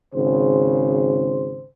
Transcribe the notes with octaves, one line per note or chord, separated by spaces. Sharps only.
G#1 C#3 C5